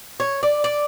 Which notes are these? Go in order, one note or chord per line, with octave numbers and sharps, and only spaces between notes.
C#5
D5
D5